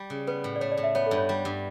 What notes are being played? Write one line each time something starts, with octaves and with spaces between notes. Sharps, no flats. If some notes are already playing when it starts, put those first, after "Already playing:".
Already playing: G3
C#3
B3 B4
A2
D5
A3 C#5
D5
A2
E5
B3 C#5
A4
G2
C#5
G3
G2